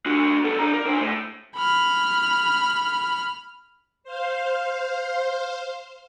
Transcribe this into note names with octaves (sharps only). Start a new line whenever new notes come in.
D4 F#4
B3 A4
D4 A#5
A#4
D4 C5
A2
B5 F6
C5 F5